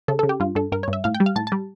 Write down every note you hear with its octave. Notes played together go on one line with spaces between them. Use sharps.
C#3 A4
C#3 A4
G4
G2 F4
G2 A4
G2 A#4
G2 C#5
E5
A2 F5
G5
G3
F5
A2 A5
G3 A5